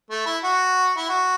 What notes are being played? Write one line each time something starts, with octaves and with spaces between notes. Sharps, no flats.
A3
E4
F#4
E4
F#4